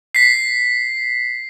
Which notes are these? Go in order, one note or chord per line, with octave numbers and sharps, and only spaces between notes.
B6 C7